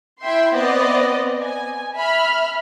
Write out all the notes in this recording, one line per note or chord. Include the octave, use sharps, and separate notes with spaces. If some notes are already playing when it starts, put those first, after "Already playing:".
E4 E5 G5 C6
B3 C4 D5 D#5
G#5
E5 B5 F6